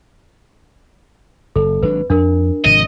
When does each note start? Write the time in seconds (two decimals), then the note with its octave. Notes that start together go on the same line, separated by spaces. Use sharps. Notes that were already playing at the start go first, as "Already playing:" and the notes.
1.56 F#1 A4
1.83 G#1 F#3 D4 B4
2.10 F2 D4 A#4
2.65 G#1 C3 F3 D#5